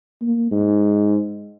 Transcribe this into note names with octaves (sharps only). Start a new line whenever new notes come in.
A#3
G#2